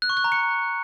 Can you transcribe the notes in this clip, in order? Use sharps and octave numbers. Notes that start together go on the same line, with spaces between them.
F#6
C#6
F#6
A#5
C#7